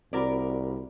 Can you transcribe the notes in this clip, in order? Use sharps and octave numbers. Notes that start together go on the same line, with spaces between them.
C2 C4 F#4 A#4 D5 B5